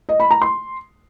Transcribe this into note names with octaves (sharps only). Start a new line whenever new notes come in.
D#5
B5
A#5
C6